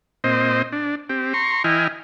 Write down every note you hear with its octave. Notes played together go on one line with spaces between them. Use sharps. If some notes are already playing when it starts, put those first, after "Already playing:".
A#2 C4 C5 D#5
D4
C4 G4
A#5 C6 C#6
E3 E4 D#5 G5 G#5 F6